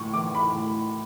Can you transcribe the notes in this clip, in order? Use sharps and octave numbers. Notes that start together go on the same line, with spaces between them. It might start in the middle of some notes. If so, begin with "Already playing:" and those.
Already playing: A2 C#6
E3 D6
B5
A2